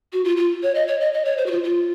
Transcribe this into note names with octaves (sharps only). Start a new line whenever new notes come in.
F#4
F4
F4
C#5
D#5
C#5
D#5
D#5
C#5
C5
F#4
F4
F4